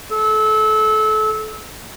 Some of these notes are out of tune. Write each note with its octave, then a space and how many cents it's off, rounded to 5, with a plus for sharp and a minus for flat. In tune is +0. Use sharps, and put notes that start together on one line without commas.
A4 -25